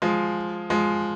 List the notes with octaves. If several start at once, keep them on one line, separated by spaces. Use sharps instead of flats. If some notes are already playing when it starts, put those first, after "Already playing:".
F3 G#3
F3 G#3